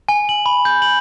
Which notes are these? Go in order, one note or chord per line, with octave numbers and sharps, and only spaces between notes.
G#5
F#7
B5
G6
F#7